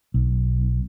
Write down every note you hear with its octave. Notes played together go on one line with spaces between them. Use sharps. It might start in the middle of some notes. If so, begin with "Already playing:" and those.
B1